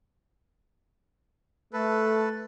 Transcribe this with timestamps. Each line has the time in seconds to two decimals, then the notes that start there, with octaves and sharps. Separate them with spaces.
1.73 A3 A4 B4